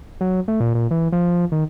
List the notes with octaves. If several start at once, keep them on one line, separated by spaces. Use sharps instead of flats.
F#3
A3
A#2
A#2
E3
F3
D#3